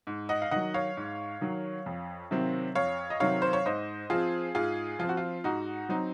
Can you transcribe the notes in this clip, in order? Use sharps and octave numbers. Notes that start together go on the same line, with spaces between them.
G#2
D#5 F#5
F5
D#3 F#3 D#5 F#5
C#5 F5
G#2
D#3 F#3
F2
C3 D#3 F#3 C4
F2 C#5 F5
D#5
C3 D#3 F#3 C4 C#5 F5
C5
C#5
G#2 C5 D#5
F3 C4 F4 G#4
G#2 F4 G#4
F3 C4 F4
F#4
F4
G#2 D#4 F#4
F#3 C4 D#4